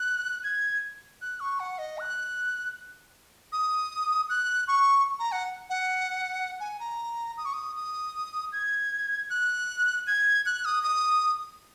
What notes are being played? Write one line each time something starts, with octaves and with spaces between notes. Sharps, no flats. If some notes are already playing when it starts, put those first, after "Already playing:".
Already playing: F#6
G#6
F#6
C#6
F#5
D#5
F#6
D#6
F#6
C#6
A#5
F#5
F#5
G#5
A#5
D#6
C#6
D#6
D#6
G#6
F#6
G#6
F#6
D#6
D#6